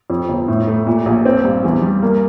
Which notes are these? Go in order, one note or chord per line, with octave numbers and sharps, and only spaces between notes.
F2
G1
A2
A3
A#2
A#1
C4
G2
E2
G3
A#3